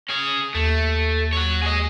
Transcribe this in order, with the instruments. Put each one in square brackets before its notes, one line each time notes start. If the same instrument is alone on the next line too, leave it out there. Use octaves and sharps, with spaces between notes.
[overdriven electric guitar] C#4 G#4
[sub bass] D#2 [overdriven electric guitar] A3
[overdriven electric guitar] F#4 C#5
G#4 D#5